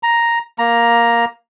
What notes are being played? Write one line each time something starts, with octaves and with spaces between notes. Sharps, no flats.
A#5
A#3 A#5